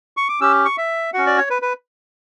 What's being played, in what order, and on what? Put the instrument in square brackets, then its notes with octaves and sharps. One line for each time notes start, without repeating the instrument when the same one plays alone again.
[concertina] C#6
D6
C#4 G4 E6
C#6
E5
C#4 F#4 F#5
D5
C#5
B4
B4